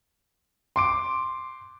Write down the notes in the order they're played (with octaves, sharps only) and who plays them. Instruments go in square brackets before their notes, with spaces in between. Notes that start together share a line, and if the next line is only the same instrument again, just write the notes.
[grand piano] C6 D6 D7